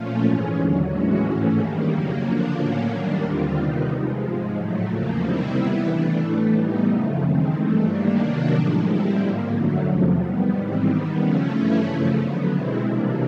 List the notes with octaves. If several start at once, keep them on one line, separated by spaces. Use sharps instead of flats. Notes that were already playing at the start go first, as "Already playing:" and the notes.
Already playing: A#2 F3 A3 C#4 F4
G#2 E3 G#3 C#4
D#2 D3 F#3
A2 E3 G#3 C#4 F#4
G#2 E3 A3 C#4
G2 D#3 G3 A#3
F2 C#3 F#3 A#3
D3 F3 A#3 D4
A2 F#3 A#3 C#4
F#2 D#3 G3 A#3 D4
D#2 D3 G3 C4 F4
C3 D#3 G3 B3 D#4
C3 F3 G#3
G#2 F3 G#3
A2 F#3 A3
E2 C#3 F3 A#3
C3 D#3 G3 C4 E4
E3 G3 B3 E4
E3 A3 D4
A2 E3 A3
E3 G3 B3 D#4
F#2 C#3 F3 A3
D#3 G#3 C4
G2 E3 A3
D#3 G3 A#3 D4
C3 D#3 F#3 A#3 D4
A2 F3 G#3
D3 G3 C4 E4
G#2 F3 A#3
F#2 D3 F#3 A3
E2 C3 F3
D#3 G3 B3
G#2 E3 G3 C4
D#3 G3 B3
C#3 F3 A3 C#4
G2 E3 A3 C#4 E4
F#2 C#3 F3 A3
D3 F#3 B3
B2 G#3 C4 E4
C3 E3 G3 A#3 D4